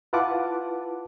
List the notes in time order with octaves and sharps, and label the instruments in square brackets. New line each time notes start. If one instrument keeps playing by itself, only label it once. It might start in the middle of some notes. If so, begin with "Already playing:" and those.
[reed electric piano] E4 F4 B4 F#5 A5 D6